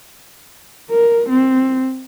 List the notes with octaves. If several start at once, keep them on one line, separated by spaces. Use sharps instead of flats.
A#4
C4